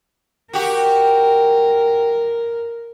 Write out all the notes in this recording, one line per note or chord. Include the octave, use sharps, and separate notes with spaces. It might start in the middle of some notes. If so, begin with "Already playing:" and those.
F#4 G4 A#4